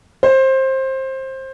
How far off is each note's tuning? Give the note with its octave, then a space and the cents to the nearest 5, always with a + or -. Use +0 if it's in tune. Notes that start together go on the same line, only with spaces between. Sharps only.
C5 +20